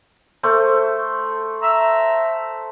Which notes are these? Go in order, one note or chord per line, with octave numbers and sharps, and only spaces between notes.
A3 C5
E5 A#5 E6